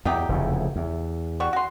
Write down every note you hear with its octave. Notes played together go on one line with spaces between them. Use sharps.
E2 F#3 D#4 G4
F1 E2 C#3
E2
G3 F#4 C#6
F#4 C6